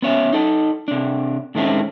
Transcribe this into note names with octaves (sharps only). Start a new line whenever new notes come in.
B3 C#4 C#5 E5
D#4 A4
C3 D4
A2 D#3 G#3 A3 C4 C#4